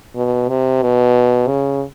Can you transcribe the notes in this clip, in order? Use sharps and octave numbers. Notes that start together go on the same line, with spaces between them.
B2
C3
B2
C#3